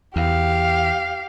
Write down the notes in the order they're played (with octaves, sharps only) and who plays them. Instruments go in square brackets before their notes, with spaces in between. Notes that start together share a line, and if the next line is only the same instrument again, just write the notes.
[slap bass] E2 [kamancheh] G4 F5